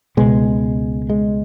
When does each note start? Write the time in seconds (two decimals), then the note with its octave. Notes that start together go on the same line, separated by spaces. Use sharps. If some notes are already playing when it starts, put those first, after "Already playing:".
0.17 C#2 B2 G#3
1.10 G#3